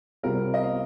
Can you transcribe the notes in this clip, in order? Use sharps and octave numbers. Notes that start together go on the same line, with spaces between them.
C2 C3 G3 C4 F4 A#4
D#5
F5